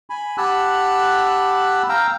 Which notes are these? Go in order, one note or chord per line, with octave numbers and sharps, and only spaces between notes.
G#5 B5
G4 F#5 A5 B5 E6 F#6
F5 G5 A#5 E6